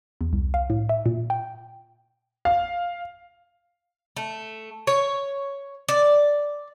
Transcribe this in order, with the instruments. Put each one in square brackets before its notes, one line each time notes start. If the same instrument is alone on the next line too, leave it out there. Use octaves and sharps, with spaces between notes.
[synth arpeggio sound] E2
C2
F5
A2
E5
A#2
G5
[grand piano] F5
[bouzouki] A3
C#5
D5